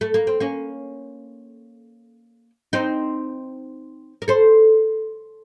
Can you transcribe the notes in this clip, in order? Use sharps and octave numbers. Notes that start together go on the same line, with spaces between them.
A3
A#3
C4
A#3 C#4
C4 D#4
A#4
A4 C5